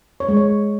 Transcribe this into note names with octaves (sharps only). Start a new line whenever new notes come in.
C#5
G#3
C#5